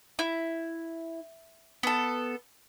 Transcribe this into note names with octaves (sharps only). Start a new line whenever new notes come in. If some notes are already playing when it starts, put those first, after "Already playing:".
E4
B3 A4